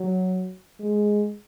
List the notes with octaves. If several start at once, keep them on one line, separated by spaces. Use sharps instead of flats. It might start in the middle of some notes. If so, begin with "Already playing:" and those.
Already playing: F#3
G#3